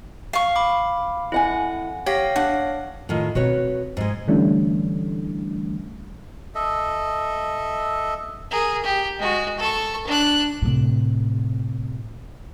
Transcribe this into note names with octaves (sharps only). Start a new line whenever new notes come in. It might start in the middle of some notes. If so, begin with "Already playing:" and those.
F5 C#6
B5 D6
F2 E4 F#5 G#5
G4 C#5 F5 A#6
D4 F#5
A2 D#3 F4
B2 C4 F#4 B4 C#5
G#2 G#3
D3 E3 G3 A3 C#4 D4
A4 D#5 E5
G#4 A#4
G4
G#3 F#4
A4 C#6
D4 F#6
A2 C3